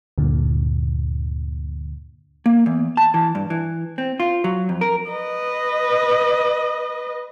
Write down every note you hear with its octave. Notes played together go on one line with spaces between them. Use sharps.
D2 G2 A#2 D3
A#3
E2
A5
E3
G2
E3
C4
F4
F#3
F2
A#4
B4 D#5